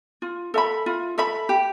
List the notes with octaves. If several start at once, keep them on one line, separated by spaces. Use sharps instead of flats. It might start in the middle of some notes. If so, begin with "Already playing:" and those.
F4
A4 E5 B5
F4
A4 E5 B5
G4